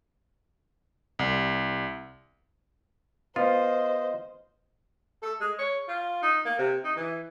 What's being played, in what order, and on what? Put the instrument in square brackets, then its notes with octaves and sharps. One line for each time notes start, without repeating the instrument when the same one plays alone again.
[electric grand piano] C2
[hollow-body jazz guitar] B3 [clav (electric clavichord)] F4 [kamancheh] C5 [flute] D#5
[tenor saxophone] A4
G#3
C#5
F4
D#4
A#3
C3
D#4
E3